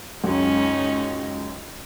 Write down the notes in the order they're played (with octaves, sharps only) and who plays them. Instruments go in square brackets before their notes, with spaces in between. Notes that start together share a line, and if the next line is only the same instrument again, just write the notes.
[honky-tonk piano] C#2 F#2 [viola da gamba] C#4 D#4